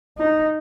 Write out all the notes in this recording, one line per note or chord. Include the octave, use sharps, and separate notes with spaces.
D#4